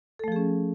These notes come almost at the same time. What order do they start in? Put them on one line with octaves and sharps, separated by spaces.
A4 A3 F3 G#4 C#4